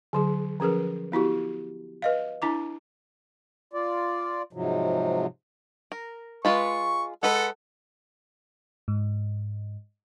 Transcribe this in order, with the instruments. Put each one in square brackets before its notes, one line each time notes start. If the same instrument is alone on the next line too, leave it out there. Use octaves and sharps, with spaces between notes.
[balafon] D3 F#3 G#4
F3 C#4 G#4 A#4 B4
B3 E4 F#4 G4
B4 D#5 F5
D4 E4 A#5 D6
[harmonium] F4 D5
G#2 C3 F3 F#3
[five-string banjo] A#4
[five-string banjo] G#3 F4 B4 [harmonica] C#6
[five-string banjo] G#3 B4 [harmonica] A4 F#5
[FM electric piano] G#2